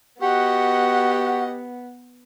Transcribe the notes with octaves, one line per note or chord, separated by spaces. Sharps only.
B3 F#4 G4 D#5 F#5